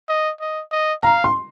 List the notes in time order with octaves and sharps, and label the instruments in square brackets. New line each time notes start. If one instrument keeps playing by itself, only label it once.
[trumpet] D#5
D#5
D#5
[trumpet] F5 [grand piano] A#5
[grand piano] C6